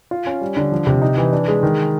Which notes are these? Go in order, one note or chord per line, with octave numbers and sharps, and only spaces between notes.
F4
C#4
G3
D3
F3
C3
D#4
E3
D4
G#3
D#3